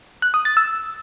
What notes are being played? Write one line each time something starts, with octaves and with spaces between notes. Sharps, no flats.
F#6
D#6
A6
E6